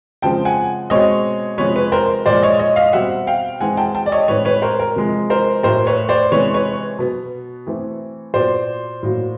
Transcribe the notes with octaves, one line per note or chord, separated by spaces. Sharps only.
C#3 F3 G#3 C4 G5 A5
F#5 G#5
B2 G#3 C4 C#5 D#5
C3 F3 G#3 B3 B4 C#5
B4
A#4 C5
A#2 F3 G#3 C5 D5
C#5 D#5
C#5 D#5
D#5 F5
B2 G3 C4 E5 F#5
F5 G5
E3 G#3 C4 F#5 G#5
G5 A5
G5 A5
D5
C#5 D#5
A2 E3 G#3 C4 B4 C#5
B4 C#5
A#4 C5
A#4
C3 F3 G#3
A#4 C5
A2 F#3 A3 A#4 C5
B4 C#5
C5 D5
C3 E3 G#3 B3 B4 C#5
B4 C#5
B2 F#3 B3
E3 A3 C4
A#2 F#3 B3 C5 D5
A2 F#3 A#3